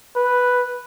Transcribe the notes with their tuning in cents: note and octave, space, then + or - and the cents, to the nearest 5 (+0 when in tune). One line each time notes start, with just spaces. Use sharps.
B4 +0